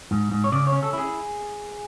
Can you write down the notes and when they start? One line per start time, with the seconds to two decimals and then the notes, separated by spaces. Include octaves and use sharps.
0.11 G#2
0.31 G#2
0.44 C#5
0.52 C#3 D5
0.67 C#5
0.72 C#4
0.83 A4
0.93 E4 G#4